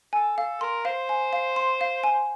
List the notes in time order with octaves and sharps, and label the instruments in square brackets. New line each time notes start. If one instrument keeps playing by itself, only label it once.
[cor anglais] A4 [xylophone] G#5
[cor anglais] A4 [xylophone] F5
[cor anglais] A#4 [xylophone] C6
[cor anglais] C5 [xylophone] F5
[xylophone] G#5
F5
C6
F5
G#5